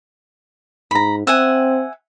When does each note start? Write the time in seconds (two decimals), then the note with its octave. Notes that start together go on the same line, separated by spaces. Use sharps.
0.91 G#2 A#5 B5
1.27 C4 E5 F#5 G#5